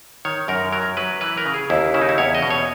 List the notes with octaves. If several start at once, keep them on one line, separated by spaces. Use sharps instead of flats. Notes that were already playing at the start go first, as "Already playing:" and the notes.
D#3 C#5
F#2 A#4
F#3 A#4
F#3 B4
E3 B4
A#4
C#3
G#4
D#2 E4
C#3 E4
D#4
E4
E2 C#5
D#5
B2
C#5